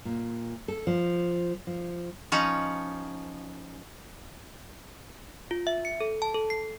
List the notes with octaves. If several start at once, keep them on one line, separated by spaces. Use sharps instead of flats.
A#2
A4
F3
F3
F3 C#4 D#4
F4
E5
C#7
A4
A5
A4
C7